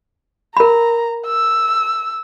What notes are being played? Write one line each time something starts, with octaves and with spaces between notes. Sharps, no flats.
A#4 A#5 B5
E6